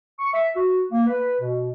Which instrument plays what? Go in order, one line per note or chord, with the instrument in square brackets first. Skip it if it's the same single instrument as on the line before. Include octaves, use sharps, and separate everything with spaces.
[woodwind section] C#6
E5
F#4
A#3
B4
B2